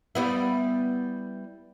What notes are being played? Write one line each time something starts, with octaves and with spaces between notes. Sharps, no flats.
G3 B3 E4